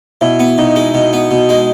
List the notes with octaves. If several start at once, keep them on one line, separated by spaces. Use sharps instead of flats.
B2 E4
B3
B2 D#4
G#3
B2
B3
B2
G#3